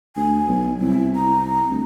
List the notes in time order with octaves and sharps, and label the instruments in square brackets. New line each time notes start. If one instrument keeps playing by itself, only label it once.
[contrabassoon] D2 [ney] G#5
[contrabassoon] B1
[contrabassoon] C2 [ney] E4
[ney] A#5
[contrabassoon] D2